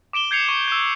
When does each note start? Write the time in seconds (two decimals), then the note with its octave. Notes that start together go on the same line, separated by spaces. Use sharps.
0.13 D6 D7 E7 G7
0.31 G6 G#6 C7 C#7 F7
0.49 C#6
0.68 E6 G6